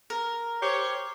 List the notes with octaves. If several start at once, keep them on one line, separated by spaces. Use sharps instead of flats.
A#4
G4 C5 C#5